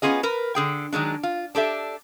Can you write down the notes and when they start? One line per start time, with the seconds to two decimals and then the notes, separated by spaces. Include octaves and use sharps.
0.02 B3 C#4 F4 G#4 D#5
0.23 A#4 B4
0.55 D3 G#4 G5
0.93 D#3 F#3 G#3 D4
1.23 F4
1.55 D4 G4 A4 E5